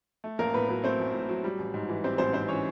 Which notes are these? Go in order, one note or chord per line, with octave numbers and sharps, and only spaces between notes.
A3
A1 A#3 A#4
A2 B3 B4
F#3 B3 B4
A3 C4 C5
A1
A2
F#3
G3
A1
G#2
E3
G3 C4 C5
A1 C4 C5
G#2 C4 C5
E3 C#4 C#5